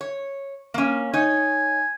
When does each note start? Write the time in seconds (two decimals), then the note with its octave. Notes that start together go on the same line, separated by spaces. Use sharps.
0.01 C#5
0.74 A#3 C#4
1.13 D#4 C#5 G#5